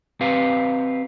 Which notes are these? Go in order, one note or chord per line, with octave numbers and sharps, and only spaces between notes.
C4 G4 B4 F5